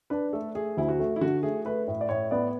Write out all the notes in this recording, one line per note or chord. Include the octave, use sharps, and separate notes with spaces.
D4 B4
A3 A4
A3 G#4
D2 E4
F#4
A3
E4
D3 F#4
A3 G#4
A3 B4
A2
D5
A2 C#5
B3 D5